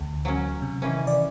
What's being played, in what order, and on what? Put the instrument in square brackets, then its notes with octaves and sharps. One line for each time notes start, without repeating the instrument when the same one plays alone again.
[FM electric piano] D2
[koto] F#3 C#4
[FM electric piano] C3
[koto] D#3 E3 C#4
[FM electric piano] D5